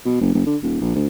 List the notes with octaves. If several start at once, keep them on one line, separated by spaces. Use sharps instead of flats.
B2
F#1
F#1
D3
D#1
A#1
D2